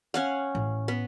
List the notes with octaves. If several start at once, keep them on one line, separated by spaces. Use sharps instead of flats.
C#4 F5 F#5
A1
B3